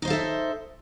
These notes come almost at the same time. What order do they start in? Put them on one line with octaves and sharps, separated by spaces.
D#4 C5 F5 A4 E5